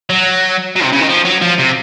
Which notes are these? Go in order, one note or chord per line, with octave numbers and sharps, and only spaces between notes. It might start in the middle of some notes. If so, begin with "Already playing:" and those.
F#3
F#3
C3
C#3
D#3
F3
F#3
F3
C3